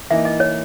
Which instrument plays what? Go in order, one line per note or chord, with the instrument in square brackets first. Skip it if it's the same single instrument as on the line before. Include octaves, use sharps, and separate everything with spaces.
[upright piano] E3 A#3 D#4 [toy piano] E5
[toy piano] D#5
C#5